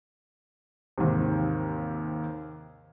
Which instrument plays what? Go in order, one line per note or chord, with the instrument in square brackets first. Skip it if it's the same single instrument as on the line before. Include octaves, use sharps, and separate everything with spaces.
[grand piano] D#2 G#2 C3